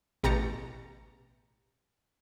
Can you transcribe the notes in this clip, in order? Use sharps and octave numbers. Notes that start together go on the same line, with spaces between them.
A1 B2 G4 A#5 A6 C#7